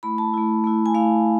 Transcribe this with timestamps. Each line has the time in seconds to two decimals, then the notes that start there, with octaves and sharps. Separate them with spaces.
0.03 A3 E4 B5
0.18 A5
0.34 A3 E4
0.64 A3 E4
0.86 G#5
0.95 A3 E4 F5